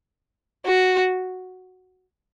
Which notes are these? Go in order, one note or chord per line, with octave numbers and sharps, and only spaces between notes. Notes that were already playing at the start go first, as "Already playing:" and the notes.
F#4